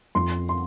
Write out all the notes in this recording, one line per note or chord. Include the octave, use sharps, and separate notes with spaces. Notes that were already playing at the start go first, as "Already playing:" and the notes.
F2 C6
C6